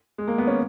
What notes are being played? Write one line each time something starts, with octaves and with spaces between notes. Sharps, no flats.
G#3
A#3
B3
C#4